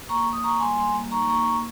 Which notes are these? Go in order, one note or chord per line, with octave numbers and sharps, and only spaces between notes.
A#3 A#5 C#6
A#3
D#6
A#3 A#5 C#6
G3 G#5 C6
G3 G#5 C6
A#3
D#4 A#5 C#6
A#3 A#5 C#6
A#3